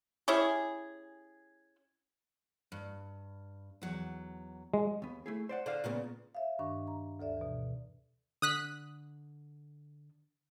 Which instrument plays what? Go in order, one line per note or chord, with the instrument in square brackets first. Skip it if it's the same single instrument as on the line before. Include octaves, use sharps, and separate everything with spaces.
[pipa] C#4 E4 G4 G#4
[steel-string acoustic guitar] G2
E2 F#3
[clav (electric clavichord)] G#3
[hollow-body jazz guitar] D#2 B3
A3 E4 G#4
C5 D5 F#5
[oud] D3 [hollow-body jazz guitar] C5 D5 F5
[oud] A#2 C#3 B3
[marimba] C#5 E5 F5
G2 D#3 D4 C#6
A#5
D2 A4 D5 E5
B2 E3
[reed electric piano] D3 [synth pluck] D#6 F#6 B6